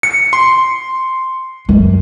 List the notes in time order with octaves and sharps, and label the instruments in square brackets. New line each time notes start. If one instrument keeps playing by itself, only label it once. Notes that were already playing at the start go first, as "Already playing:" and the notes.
[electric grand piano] C#7
C6
[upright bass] F#2